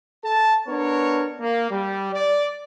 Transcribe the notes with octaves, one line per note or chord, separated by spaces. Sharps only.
A4 A5
B3 D4 A#4 C#5
A#3
G3
D5